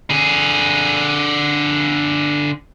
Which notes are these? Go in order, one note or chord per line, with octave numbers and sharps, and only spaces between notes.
D3 G#4